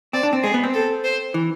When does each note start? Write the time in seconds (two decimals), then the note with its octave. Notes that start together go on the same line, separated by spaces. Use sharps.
0.13 C4 D5
0.23 D4
0.33 C4
0.43 G#3 G#4
0.54 B3
0.64 C4
0.74 A4
1.04 C5
1.34 E3